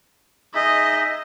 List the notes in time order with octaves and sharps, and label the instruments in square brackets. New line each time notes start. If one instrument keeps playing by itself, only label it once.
[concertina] D#4 G#4 E5 [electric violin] D#5